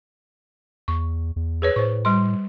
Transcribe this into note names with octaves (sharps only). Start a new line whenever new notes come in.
E2 C#6
E2
G#4 B4 C#5
A2 C5 C#6
G3 C6